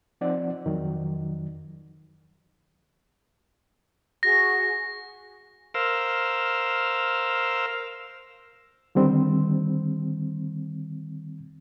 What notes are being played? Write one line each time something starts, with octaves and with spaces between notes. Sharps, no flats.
F3 C4 D#4 D5 F#5
F2 D#3 F#3
F#4 G#4 C#6 A#6
A#4 C5 F5 E6
D3 D#3 G3 C4